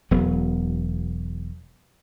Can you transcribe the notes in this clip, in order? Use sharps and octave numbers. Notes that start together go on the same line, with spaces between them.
E1 F#3 B3